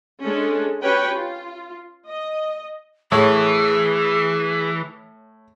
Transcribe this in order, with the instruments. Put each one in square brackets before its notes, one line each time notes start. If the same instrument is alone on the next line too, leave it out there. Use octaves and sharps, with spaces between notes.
[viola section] G#3 C#4 D4 A4
C#4 F#4 G4 B4 C#5 G5
F4
D#5
[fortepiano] A2 C#5 [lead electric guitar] E3 [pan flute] G#4